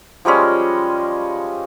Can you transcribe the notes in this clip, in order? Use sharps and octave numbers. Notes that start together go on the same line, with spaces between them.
F3 G3 G#3 C#4